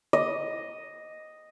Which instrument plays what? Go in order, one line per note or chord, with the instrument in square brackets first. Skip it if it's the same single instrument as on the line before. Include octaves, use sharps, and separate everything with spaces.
[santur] D#5